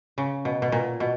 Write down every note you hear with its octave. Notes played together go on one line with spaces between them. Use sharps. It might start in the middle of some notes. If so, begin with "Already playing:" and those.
C#3
B2
B2
A#2
B2